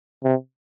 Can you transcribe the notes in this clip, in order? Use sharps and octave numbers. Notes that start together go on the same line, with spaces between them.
C3